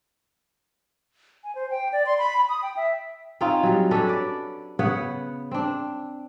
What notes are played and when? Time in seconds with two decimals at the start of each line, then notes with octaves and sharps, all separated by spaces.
1.44 G#5
1.55 C5
1.70 G5
1.93 D5
2.06 C6
2.18 B5
2.37 B5
2.49 D#6
2.62 G5
2.76 E5
3.41 C4 C#4 D#4 F4
3.63 F#3 G3
3.91 C#4 D4 A4 B4
4.09 D5
4.79 C#3 B3 C#5 F#5
5.51 C4 D4